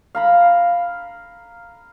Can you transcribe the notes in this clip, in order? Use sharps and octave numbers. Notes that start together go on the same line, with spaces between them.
F5 A#5 B5